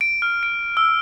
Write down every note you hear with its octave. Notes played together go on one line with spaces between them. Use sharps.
D7
F6
D7
E6